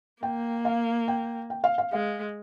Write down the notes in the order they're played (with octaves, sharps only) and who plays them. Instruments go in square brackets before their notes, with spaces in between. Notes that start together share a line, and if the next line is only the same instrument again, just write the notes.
[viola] A#3 [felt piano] G5
[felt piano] F5
G5
G5
F5
F5
[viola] G#3 [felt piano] F5